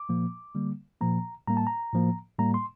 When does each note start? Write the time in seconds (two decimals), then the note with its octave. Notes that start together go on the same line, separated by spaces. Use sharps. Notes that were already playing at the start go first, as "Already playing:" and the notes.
Already playing: D6
0.09 A#2 F3 A#3
0.55 D3 G3 A#3
1.01 A#2 F3 A#3 A#5
1.47 A2 G3 A#3 A#5
1.57 A5
1.67 A#5
1.93 A2 F3 A#3
2.39 A2 G3 A#3 A#5
2.54 C6